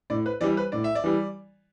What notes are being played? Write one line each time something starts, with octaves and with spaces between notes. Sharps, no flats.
A2 D5
B4
E3 G3 D5
B4
A2 D5
E5
D5
E3 G3